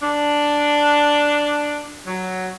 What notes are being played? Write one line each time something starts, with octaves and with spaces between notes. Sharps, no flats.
D4
F#3